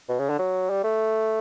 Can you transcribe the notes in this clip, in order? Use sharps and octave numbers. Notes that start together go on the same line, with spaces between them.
B2
C#3
D3
F#3
G3
A3